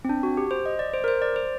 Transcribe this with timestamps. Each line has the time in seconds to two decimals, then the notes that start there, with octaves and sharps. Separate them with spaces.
0.05 C4
0.09 D4
0.23 F#4
0.37 G4
0.51 C5
0.66 D#5
0.79 D5
0.93 C5
1.04 A#4
1.08 C5
1.22 D5
1.36 C5